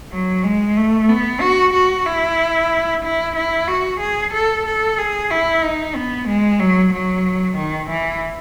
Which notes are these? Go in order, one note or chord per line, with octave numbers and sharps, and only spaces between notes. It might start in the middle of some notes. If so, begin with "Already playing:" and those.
F#3
G#3
A3
B3
F#4
F#4
E4
E4
E4
F#4
G#4
A4
A4
G#4
E4
D#4
B3
G#3
F#3
F#3
D#3
E3